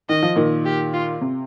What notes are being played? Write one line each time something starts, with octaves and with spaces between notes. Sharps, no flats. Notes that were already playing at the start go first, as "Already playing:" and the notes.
D#3 D#5
F3
A#2 D#3
G4
F4
C3